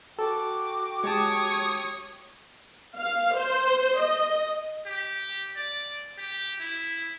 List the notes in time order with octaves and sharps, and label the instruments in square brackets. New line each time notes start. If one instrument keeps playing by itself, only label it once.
[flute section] F#4 G5 D6 [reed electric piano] A4
[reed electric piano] G#3 G4 A5 [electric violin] C#5 D#6
[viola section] F5
C5
D#5
[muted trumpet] G4
D5
G4
E4